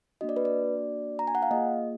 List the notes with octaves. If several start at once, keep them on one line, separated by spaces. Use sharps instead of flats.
A#3 D4 F#4 D#5
D5
B4
D5
A#5
G#5
F#5
F5
A#3 F4 G#4 D#5